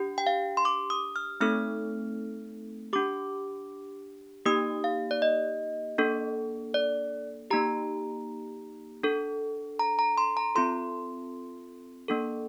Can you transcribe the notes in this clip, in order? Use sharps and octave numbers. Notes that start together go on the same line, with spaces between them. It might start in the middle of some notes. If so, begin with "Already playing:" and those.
Already playing: D4 G4
G5
F5
C6
D6
D#6
F6
A3 C4 D#4 A4 F6
D4 G4 D6
A#3 D#4 G4 D#6
F5
D5
D#5
A#3 D4 A4
D5
A#3 D#4 G4 A#5
D4 A4
A#5
A#5
C6
A#5
C4 F4 A4 C6
A#3 D4 A4